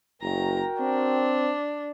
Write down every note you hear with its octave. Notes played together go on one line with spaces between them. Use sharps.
F#1 F#4 A#4 G5 A#5
C4 D4